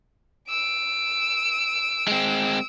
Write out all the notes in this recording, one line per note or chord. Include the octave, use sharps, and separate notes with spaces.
E6 D7
G#3 C4